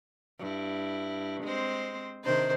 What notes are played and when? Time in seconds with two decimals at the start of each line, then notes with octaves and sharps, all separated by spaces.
0.39 G2 E4
1.44 G#3 C4 C5
2.24 C3 D#3 D4 C5